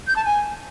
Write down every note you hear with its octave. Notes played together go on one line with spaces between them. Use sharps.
G6
A5
G#5